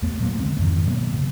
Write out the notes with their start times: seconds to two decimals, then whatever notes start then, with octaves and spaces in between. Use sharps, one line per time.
0.02 E2 A3 B3
0.20 A#2 F#3 A#3
0.40 D3 G#3 C4
0.58 F2 G#2 D#3 E3
0.86 B2 F#3 A#3 B3
1.13 A#2 C#3